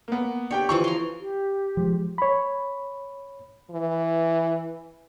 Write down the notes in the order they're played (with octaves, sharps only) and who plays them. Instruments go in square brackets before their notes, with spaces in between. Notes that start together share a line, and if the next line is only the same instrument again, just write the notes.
[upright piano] A#3 B3
[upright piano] D4 G4 G5 [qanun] C#5
[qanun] E3 F3 C#5 [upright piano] C#6
[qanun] A#5 C6
[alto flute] G4
[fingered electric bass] F3 G#3
[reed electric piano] C#5 B5
[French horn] E3